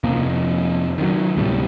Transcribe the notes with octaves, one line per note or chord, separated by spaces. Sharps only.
F2 C3 F3 A#3
D#3 E3 F#3
D2 A2 C3 G3